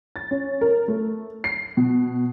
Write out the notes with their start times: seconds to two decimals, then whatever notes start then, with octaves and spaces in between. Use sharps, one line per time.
0.16 A6
0.31 C#4
0.61 A#4
0.88 A3
1.44 C7
1.77 B2